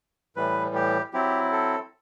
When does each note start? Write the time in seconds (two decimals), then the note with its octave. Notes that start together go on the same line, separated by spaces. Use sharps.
0.36 A2 E3 G3 B4
0.75 G4
1.13 F#3 C4 E4 G4
1.52 A4